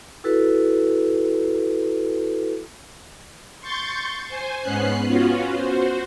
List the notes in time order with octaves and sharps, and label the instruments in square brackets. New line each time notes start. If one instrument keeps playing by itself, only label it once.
[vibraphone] E4 F#4 A4 B4
[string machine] C6 C#6 G6 A6
C5 G#5
G#2 B3 C#4 F#6 C7
B3 C#4 F4 F#4
F#4 C5